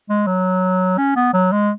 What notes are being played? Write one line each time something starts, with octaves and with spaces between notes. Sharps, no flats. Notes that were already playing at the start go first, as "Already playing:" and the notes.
G#3
F#3
C#4
B3
F#3
G#3